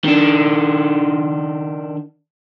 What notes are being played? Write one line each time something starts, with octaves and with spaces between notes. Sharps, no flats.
D#3 D4